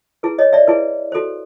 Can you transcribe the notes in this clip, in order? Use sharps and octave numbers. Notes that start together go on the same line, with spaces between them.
E4 G#4 B4
C#5 D#5
D5 E5
E4 G#4 B4
F#4 A4 C5